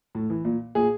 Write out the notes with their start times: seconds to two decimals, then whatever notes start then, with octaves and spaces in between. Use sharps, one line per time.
0.15 A2
0.30 E3
0.45 A#2
0.75 A#2 G#4